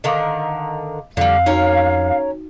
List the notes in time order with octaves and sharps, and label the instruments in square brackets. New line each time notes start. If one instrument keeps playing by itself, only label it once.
[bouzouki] D3 D#3 A#4 [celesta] D#5 F5 D6
[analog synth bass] F2 [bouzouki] D3 G3 [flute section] F5
[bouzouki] C#4 A#4 C#5 [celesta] D#4 F#4